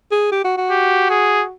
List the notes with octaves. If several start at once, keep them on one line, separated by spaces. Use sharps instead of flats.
G#4
G4
F#4
F#4
G4
G#4